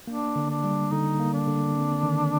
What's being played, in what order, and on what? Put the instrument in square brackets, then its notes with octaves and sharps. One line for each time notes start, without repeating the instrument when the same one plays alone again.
[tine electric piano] A#3 [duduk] D4
[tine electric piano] D3
[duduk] D4
[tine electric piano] G3
[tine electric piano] D3 [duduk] D#4
[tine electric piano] A#3
[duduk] D4
[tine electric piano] D3
C4
D#3